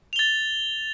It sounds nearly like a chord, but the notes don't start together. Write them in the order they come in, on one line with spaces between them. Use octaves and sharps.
F7 G7 A6